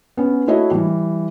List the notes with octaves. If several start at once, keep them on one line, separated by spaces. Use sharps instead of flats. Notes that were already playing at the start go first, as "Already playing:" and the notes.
B3 C#4
A3 E4 F#4 C#5 D#5
E3 G3